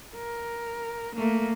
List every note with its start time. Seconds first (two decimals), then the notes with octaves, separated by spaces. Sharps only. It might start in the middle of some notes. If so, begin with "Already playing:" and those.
0.15 A#4
1.15 A3 A#3